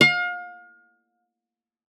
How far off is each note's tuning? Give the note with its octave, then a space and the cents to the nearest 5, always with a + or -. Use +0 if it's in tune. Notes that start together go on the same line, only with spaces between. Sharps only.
F5 +35